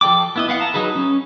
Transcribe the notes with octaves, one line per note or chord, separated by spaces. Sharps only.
F3 A4 D5 G5 D6
B3 E4 D#5
B3 F5 F#5
A5 A#5
F#3 D#4 G#4 B4
C#4